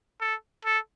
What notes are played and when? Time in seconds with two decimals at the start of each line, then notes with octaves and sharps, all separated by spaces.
0.21 A4
0.65 A4